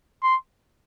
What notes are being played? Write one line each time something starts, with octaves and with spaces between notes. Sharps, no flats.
C6